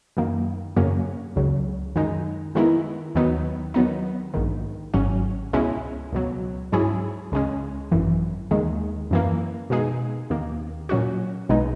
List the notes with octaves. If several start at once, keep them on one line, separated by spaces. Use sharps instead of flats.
F#2 D#3 A#3
F#2 C#3 F#3 A#3 C#4
C#2 C#3 F#3
F#2 D#3 G#3 D#4
D#3 G#3 B3 E4 A#4
D#2 D#3 F#3 B3 D#4
D#3 F#3 B3 D#4
A#1 G#2 D#3
G#1 G#2 F#3 C#4
C#2 B2 G#3 C#4 E4
C#2 B2 F#3
G#2 F#3 C#4 E4 G#4
C#2 C#3 G#3 C#4
G#1 F#2 E3
D#2 D#3 G#3
F#2 E3 A#3
B2 G#3 D#4 G#4
D#2 D#3 A#3
A#2 F#3 C#4 F#4
B1 B2 G#3 B3 D#4